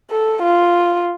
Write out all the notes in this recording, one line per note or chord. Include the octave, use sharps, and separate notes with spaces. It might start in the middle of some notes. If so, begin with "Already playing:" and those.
A4
F4